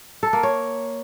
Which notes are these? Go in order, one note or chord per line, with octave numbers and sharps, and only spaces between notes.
A4
A#3
C#5